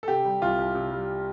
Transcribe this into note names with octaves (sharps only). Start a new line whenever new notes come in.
A4
C3 G4
G3
C2 F4
C2
C3
G3